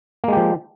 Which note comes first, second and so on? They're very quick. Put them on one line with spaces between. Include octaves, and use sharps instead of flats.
A#3 G#3 G4 F3